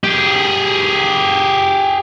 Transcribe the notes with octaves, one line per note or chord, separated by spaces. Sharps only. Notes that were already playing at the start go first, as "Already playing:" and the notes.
G4 G#4